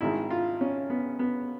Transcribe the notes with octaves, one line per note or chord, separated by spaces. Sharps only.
G#1 G#2 D#3 E4
F4
C#4
B3
B3